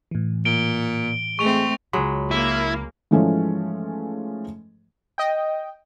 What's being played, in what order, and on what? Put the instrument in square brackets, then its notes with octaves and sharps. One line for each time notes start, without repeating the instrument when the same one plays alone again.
[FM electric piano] A2 E3
[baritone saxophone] A#2 [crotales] D7 G7
[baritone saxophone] G#3 [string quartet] A3 C4 [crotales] C#6 F7
[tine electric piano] C#2 B5 [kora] F#3 G#3
[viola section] A#3 [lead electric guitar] E4
[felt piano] G#2 E3 F3 G#3 A3 C#4
[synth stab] D#5 G5